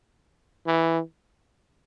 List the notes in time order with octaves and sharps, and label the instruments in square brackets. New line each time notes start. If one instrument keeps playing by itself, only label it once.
[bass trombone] E3